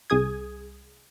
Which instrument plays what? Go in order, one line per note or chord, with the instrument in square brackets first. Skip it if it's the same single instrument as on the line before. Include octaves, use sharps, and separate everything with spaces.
[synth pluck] C2 G#4 D#6 G#6